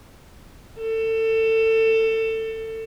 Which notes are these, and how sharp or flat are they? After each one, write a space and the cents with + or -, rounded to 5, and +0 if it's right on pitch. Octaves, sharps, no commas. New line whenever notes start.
A4 +25